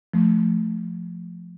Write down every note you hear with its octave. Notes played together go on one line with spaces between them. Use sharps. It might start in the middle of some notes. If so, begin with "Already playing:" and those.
F3 A3